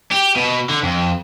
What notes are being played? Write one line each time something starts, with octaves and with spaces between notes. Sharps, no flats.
G4
B2
D3
F2